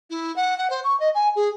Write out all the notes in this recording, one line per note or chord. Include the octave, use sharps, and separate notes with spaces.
E4
F#5
F#5
C5
C#6
D#5
G#5
G#4